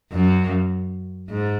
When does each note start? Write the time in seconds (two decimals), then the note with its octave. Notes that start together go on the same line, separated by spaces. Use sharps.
0.13 F#2
1.29 G#2